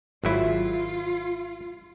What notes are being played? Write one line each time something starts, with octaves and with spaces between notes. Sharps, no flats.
G#1 F#3 E4 F4